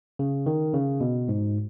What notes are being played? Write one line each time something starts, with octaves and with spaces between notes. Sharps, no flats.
C#3
D#3
C#3
B2
G#2